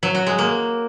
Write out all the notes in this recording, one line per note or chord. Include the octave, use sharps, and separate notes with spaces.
F#3
F#4
G#3
A#3